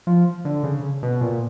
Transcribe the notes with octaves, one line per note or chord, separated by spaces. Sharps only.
F3
D3
C#3
B2
A#2